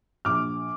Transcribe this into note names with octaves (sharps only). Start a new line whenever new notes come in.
A#1 D6 F6